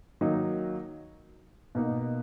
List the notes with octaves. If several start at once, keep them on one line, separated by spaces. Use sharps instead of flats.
D#3 F#3 A#3 D#4
B2 A#3 D#4